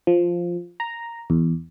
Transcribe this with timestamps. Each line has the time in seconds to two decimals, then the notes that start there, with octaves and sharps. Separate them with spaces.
0.07 F3
0.80 A#5
1.30 E2